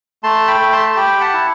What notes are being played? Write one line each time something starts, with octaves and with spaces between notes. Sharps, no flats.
A3 A5 C6
G5 B5
A3
A5 C6
C6
G4 G5 B5
F#5 A5
E4